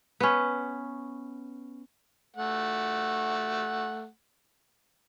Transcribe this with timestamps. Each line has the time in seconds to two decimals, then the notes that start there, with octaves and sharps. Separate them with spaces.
0.20 B3 C#4
2.36 A3 F#5